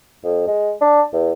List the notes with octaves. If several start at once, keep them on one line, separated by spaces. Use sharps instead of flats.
F2
G#3
D4
E2